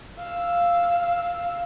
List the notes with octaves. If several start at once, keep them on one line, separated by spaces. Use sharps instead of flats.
F5 E6